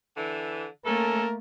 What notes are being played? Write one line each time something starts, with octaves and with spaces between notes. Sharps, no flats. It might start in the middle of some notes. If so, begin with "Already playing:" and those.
D3 E3
A3 A#3 C#4 A4 A#4